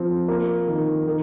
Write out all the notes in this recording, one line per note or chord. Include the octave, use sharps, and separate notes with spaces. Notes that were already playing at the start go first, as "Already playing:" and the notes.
Already playing: F3 C4
A#3
D#3
D#3